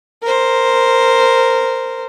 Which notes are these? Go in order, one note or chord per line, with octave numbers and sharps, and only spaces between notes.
A#4 C5